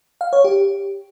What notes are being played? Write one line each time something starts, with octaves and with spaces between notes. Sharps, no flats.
F5
C#5
G4